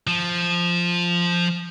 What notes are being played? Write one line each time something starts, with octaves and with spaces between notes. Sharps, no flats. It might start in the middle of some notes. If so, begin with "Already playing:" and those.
F3